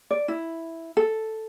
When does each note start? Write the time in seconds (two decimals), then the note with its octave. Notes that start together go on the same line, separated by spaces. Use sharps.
0.11 D5
0.28 E4
0.97 A4